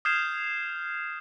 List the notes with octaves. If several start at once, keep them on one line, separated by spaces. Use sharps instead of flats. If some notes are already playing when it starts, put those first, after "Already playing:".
D#6 F6 G6 G#6 C7 E7